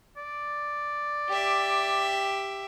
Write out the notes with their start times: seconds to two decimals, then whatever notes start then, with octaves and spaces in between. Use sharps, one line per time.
0.17 D5
1.29 G4 E5